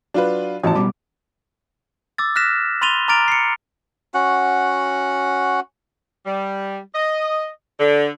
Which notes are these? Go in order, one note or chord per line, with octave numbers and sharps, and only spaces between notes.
F#3 D4 F4 B4
A1 E2 F3 F#3 A5
B2 G3 D6
D6 E6 A6
F6 F#6 A#6 B6 E7
B5 C6 A6 D#7 F7 G7
A#5 D6 F6 A6 D7 F7
C7 C#7
C#4 F#4 F#5
G3
D#5
D3